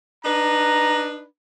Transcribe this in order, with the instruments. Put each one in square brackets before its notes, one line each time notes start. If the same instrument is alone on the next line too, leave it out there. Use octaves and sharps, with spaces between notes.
[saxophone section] D4 D#4 B4 [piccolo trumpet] A#5